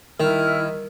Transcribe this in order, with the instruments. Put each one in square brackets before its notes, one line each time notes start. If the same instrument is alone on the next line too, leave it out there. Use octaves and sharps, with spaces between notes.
[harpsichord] D#3 [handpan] G3 A#4 [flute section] E4 F6